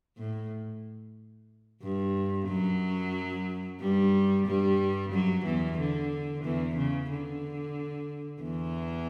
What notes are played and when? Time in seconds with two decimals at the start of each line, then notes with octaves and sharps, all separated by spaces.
0.18 A2
1.82 G2
2.48 F#2 F#3
3.80 G2 G3
4.46 G2 G3
5.12 F#2 F#3
5.45 E2 E3
5.79 D3
6.44 E2 E3
6.77 C#3
7.10 D3
8.41 E2 E3